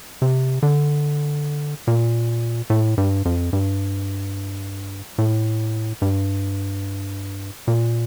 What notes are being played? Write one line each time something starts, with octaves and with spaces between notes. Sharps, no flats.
C3
D3
A#2
A2
G2
F2
G2
A2
G2
A#2